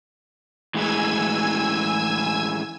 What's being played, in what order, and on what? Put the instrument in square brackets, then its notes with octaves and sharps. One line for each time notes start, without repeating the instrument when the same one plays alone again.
[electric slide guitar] A2 E3 G#3 [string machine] G#5 E6 G#6